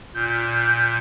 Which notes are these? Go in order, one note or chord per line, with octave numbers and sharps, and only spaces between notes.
A#2 G6